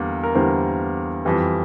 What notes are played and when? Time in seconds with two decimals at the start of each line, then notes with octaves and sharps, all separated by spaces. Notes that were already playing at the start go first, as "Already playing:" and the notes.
Already playing: E2 D3 G3 A#3
0.24 A#4
0.35 E2 D3 G3 A#3 C5
1.25 F2 E3 G3